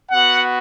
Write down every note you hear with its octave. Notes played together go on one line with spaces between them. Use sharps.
B3 F#4 F#5